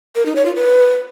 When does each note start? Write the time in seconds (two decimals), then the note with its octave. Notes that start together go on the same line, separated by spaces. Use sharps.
0.16 A#4
0.26 D#4
0.36 C#5
0.46 F4
0.56 B4